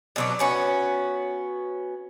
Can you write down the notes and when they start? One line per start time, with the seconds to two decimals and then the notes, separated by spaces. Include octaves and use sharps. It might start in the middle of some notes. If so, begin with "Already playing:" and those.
0.16 B2 F#3 D4
0.39 B3 C#4 F#4